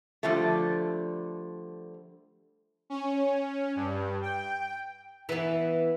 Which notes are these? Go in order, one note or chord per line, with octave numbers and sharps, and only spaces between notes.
D3 F3 G3 A3
C#4
G2
G5
E3 B3